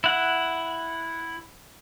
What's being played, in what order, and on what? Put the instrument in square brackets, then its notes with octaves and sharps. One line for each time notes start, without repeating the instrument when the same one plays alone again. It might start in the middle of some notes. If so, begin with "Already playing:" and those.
[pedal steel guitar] E4 F#5